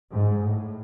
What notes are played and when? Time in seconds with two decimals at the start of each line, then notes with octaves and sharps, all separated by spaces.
0.13 G#2
0.43 A2